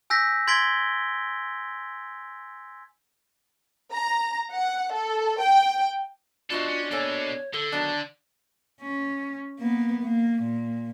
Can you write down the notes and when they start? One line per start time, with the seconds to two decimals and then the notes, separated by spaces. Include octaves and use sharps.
0.10 G#5 E6 G6 A#6 B6
0.47 C6 G#6 A6 B6 D7 G7
3.92 A#5
4.52 F#5
4.93 A4
5.40 G5
6.50 B3 D4 F4 F#4 A4 C5 D#5
6.68 C#4
6.91 B2 A#3 A4 C#5 G#5
7.54 D3 A4
7.72 D#3 F#3 B3 D4 A5
8.81 C#4
9.60 A#3 B3
10.03 A#3
10.43 A#2